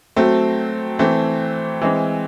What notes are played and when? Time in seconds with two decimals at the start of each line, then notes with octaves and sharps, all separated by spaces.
0.16 F#3 A3 C4
0.99 E3 A3 C4
1.82 E3 G#3 C4